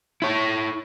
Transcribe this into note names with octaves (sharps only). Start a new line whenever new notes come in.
E4 C#5